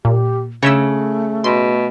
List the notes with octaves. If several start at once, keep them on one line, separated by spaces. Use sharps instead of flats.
A#2 G4
C#3 A3 C#5 E5 E6
B2 C6